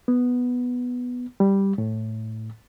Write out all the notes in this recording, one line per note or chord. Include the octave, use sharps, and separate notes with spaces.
B3
G3
A2